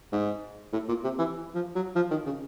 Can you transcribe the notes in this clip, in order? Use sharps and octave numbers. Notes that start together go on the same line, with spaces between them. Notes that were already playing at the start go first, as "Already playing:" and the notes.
G#2
A2
A#2
C3
E3
F3
F#3
F3
D#3
C#3